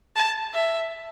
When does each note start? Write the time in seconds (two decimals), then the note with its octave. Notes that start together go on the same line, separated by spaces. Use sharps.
0.16 A5
0.54 E5